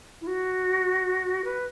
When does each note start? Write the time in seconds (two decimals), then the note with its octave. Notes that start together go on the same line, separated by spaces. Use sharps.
0.21 E4
0.27 F#4
1.44 B4